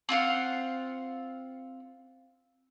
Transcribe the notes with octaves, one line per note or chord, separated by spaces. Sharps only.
C4 F4 F5 F#5